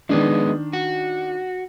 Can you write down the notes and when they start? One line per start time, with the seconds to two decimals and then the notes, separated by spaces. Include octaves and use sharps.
0.09 D#3 F3 G#3 B3 D4
0.73 F#4